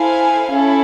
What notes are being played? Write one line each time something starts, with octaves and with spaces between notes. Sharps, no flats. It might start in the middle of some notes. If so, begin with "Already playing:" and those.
Already playing: E4 A4 C5 F5 G#5
C#4 E4 A4